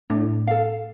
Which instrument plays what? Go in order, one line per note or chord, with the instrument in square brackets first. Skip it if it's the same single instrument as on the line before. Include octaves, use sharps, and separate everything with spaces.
[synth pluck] A2 [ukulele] D4
[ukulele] A4 F5